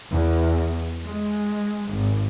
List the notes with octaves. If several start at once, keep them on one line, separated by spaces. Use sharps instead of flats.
E2
G#3
G#1